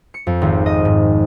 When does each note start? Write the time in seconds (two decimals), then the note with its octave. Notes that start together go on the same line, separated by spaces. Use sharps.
0.14 C#7
0.27 F2
0.42 G#1
0.66 D#5
0.85 G#2